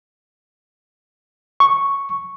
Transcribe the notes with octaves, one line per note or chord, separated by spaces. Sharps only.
C#6